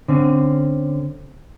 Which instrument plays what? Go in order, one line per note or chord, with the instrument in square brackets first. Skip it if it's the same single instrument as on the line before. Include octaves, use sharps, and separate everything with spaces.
[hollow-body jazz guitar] D3 C4 C#4